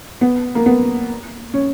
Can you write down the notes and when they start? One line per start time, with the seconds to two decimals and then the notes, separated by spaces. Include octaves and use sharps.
0.21 B3
0.55 A#3
0.66 B3
1.53 C#4